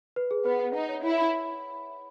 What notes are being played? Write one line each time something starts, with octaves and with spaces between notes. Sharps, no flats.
B4
G#4
B3 B4
F#5
D#4 F#5
C#5
E4 C#5
B5